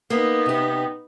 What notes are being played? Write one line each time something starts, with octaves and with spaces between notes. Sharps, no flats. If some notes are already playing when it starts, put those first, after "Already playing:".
A#3 B3 D#4
C3 G4